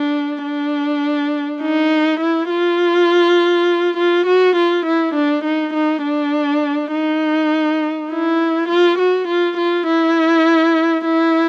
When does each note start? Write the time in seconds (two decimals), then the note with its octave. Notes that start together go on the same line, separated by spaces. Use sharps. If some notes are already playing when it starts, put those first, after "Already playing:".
Already playing: D4
0.44 D4
1.62 D#4
2.20 E4
2.50 F4
3.97 F4
4.27 F#4
4.56 F4
4.86 E4
5.15 D4
5.45 D#4
5.74 D#4
6.03 D4
6.92 D#4
8.10 E4
8.68 F4
8.98 F#4
9.28 F4
9.57 F4
9.86 E4
11.05 E4